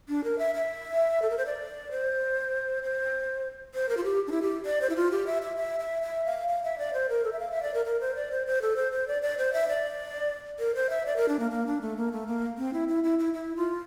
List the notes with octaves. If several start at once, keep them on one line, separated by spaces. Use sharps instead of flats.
D4
A#4
E5
E5
A4
A#4
C5
D5
C5
C5
C5
A#4
F4
G4
D4
E4
G4
D5
C5
E4
F4
G4
E5
E5
E5
E5
E5
F5
F5
E5
D5
C5
A#4
A4
E5
F5
E5
D5
A#4
A#4
C5
D5
C5
C5
A4
C5
C5
D5
D5
C5
E5
D5
A#4
C5
E5
D5
A#4
D4
A#3
A#3
D4
A3
A#3
A3
A#3
C4
E4
E4
E4
E4
E4
F4